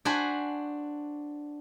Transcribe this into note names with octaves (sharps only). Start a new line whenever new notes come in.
D4 F#4 C5 G#5 B5